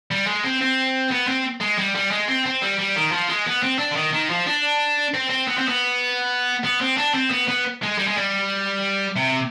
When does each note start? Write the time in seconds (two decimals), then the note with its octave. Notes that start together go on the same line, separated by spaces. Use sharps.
0.11 G3
0.27 G#3
0.44 C4
0.61 C4
1.11 B3
1.28 C4
1.61 G#3
1.79 G3
1.95 G3
2.11 G#3
2.28 C4
2.46 C4
2.62 G3
2.79 G3
2.96 D#3
3.12 F3
3.29 G#3
3.46 B3
3.63 C4
3.79 D4
3.91 D3
3.95 D#3
4.13 D#3
4.30 F3
4.46 D4
5.14 C4
5.30 C4
5.48 B3
5.58 C4
5.68 B3
6.64 B3
6.81 C4
6.98 D4
7.15 C4
7.31 B3
7.48 B3
7.82 G#3
7.98 G3
8.07 G#3
8.17 G3
9.16 C3